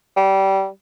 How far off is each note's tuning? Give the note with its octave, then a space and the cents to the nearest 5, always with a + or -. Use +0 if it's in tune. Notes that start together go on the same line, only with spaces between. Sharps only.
G3 -20